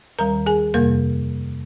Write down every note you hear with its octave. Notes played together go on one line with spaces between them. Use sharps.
D#2 D#3 G3 A#4 A#5
G#4 G#5
F2 C3 G3 A#3 A#4